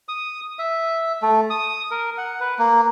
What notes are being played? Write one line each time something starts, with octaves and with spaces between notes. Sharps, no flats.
D#6
E5
A3
D#6
A#4
F#5
B4
A#3